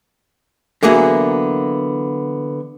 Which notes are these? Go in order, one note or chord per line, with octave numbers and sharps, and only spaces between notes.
D3 E3 F#3 A#3 B3 G#4